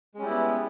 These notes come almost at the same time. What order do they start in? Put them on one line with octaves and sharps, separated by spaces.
G#3 C#4 G3 E4 B3